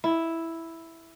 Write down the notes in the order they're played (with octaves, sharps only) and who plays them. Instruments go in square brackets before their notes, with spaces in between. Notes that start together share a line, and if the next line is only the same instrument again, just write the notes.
[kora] E4